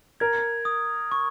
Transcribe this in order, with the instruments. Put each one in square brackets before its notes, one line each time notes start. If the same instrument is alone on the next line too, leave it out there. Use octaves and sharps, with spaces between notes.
[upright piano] A#4 [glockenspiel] G#6
[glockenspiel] D#6
C#6